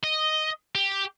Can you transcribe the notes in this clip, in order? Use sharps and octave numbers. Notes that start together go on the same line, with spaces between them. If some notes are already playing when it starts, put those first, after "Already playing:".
D#5
G4